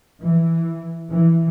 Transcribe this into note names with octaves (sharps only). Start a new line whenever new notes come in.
E3
E3